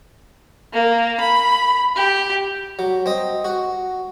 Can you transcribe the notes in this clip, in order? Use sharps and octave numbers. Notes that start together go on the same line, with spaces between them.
A#3
B5
G4
F#3
C4 D#5
F#4